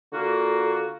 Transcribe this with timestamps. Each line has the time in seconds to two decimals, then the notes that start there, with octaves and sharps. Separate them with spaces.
0.12 D3 A#3 F4 F#4